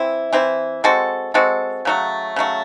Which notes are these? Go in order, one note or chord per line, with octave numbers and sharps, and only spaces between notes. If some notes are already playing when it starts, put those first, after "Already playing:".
Already playing: E3 C4 E4
E3 C4 E4
G#3 C4 F#4 A4
G#3 C4 F#4 A4
C#3 F#3 A3
C#3 F#3 A3